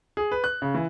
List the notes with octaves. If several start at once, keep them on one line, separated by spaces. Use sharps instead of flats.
G#4
B4
F#6
C#3
E3